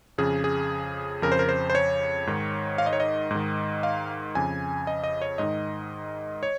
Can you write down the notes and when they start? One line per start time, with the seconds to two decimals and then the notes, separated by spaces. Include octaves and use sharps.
0.18 F2 C#3 G#4
0.44 G#4
1.22 F2 C#3 A#4
1.32 C5
1.39 A#4
1.49 C5
1.70 C5
1.75 C#5
2.27 G#2 D#3
2.78 F5
2.86 D#5
2.93 C#5
3.00 D#5
3.31 G#2 D#3
3.83 F5
4.35 F2 C#3 G#5
4.87 D#5
5.04 D#5
5.22 C#5
5.38 G#2 D#3 D#5
6.43 C#5